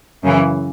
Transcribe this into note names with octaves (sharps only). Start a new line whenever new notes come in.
F#2 C#3 E3